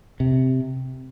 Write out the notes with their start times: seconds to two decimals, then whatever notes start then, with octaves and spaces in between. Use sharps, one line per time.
0.20 C3